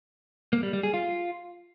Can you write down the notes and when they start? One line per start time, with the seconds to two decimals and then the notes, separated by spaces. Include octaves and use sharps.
0.53 A#3
0.63 G3
0.73 G3
0.83 G#4
0.94 F4